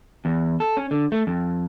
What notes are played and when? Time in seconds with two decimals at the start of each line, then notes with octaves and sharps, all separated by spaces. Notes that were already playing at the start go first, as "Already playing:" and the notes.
0.25 E2
0.60 A4
0.77 C#4
0.91 D3
1.12 A3
1.27 F2